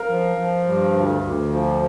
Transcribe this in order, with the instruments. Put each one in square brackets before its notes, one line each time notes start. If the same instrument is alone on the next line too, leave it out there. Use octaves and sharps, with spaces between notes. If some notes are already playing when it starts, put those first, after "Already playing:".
Already playing: [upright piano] A#4 F5
[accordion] F3
F3
G2
D2
D2
F3